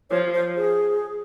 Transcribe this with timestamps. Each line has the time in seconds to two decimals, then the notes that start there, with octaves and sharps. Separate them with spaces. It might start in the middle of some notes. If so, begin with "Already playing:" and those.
0.10 F3 C#5
0.34 C5
0.57 G#4